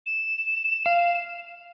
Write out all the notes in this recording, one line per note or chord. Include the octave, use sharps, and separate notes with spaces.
E7
F5